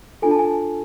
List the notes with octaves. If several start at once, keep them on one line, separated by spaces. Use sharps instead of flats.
D4 F4 A4 G#5
A5
G#5